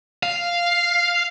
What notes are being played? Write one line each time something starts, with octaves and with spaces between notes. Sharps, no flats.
F5